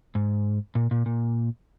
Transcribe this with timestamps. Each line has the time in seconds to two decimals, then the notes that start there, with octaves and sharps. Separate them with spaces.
0.15 G#2
0.75 A#2
0.91 A#2
1.06 A#2